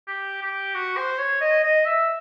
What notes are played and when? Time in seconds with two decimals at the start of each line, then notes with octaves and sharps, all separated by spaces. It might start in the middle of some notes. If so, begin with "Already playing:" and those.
0.08 G4
0.42 G4
0.75 F#4
0.97 C5
1.18 C#5
1.41 D#5
1.64 D#5
1.85 E5